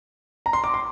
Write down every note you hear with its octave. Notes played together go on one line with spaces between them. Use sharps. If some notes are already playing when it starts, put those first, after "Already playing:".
A#5
C6
D6
C6